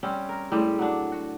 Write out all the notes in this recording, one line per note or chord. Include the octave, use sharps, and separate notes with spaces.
G3 C4 C#4
A#4
A2 G3 G#3 G4
F#3 D4
F#4